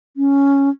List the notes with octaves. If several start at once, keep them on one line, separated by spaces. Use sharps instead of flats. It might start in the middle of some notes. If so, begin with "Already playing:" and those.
C#4